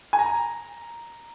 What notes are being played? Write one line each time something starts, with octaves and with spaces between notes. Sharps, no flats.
G#5
A#5